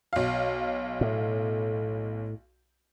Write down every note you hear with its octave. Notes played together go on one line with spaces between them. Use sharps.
B1 F5
A2